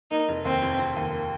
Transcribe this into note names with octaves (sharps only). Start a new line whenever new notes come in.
A#3 D#4
F1
D#2 C4
F1
F1
D#2
A#3